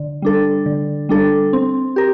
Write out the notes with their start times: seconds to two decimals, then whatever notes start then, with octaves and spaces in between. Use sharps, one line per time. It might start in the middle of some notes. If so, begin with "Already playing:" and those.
Already playing: D3
0.22 G3 D4 A4
0.66 D3
1.09 G3 D4 A4
1.53 C4
1.96 G4 A#4